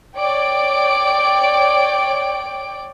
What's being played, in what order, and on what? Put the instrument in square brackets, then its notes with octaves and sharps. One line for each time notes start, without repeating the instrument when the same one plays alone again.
[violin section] C#5 D5 G5 D7